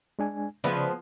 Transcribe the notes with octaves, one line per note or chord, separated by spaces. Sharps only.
G#3 D4 G#5
C#3 F3 G#3 B3 B4 D5 E5